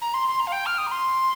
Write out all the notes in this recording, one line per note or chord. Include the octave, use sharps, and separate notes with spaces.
A#5
C6
C6
A#5
F5
G5
F6
D#6
A#5
C6